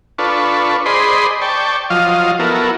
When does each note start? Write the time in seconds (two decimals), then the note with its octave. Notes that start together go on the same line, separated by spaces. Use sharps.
0.19 D4 F4 A4 B4 C#6
0.86 G#4 C5 D5 D#5 B5 C6
1.41 D5 G5 A5 C#6
1.90 F3 F#3 F4 D#5 F5
2.39 B3 E4 F#4 A4 A#4